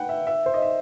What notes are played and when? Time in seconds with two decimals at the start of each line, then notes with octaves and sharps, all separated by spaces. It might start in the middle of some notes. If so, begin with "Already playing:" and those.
Already playing: B4 F#5 G5
0.09 E5
0.27 E5
0.46 C5
0.54 D#5
0.62 E5